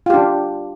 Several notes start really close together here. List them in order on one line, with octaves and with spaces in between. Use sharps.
F4 G4 D4